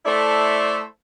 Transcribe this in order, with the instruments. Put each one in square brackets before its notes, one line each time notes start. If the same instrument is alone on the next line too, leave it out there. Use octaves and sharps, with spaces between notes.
[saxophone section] A3 E4 A4 C5 D5